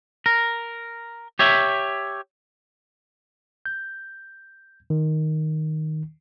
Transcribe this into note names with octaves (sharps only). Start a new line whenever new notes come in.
A#4
G4 C#5 E5
G6
D#3